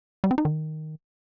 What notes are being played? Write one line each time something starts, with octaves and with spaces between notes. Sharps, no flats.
G3
C4
D#4
D#3